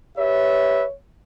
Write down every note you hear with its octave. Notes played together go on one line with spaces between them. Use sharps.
G4 B4 C#5 E5